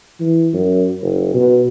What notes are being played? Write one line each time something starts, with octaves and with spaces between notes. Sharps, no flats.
E3
F#2
F#1
B2